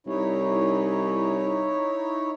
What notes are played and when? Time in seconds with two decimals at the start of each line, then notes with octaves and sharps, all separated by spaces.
0.07 C2 D#4 E4 C#5